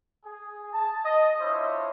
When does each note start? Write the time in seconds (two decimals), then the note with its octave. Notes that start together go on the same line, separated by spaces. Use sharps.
0.25 G#4
0.73 A5
1.05 D#5
1.41 D4 E4 F4 C5 C#5 E5